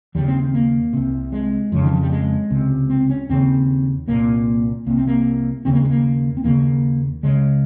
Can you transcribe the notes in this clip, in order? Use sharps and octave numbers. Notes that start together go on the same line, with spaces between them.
D#2 C#3 G3
C4
C4
A#3
C2 C3
G#3
F2 C#3
D#3
F3
G3
G#3
C#2 C3
C4
C#4
D#2 C#3 C4
C2 A#2 A#3
C2 C3 A#3
C4
A#3
D#2 C#3 C4
A#3
G#3
A#3
C4
D#2 C#3 A#3
C#2 C#3 G#3